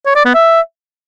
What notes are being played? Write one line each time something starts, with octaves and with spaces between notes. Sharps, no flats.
C#5
D5
B3
E5